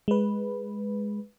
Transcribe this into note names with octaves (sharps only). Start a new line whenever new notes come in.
G#3 B4